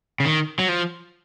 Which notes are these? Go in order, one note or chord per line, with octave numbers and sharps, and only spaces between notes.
C#3
D#3
F#3
F3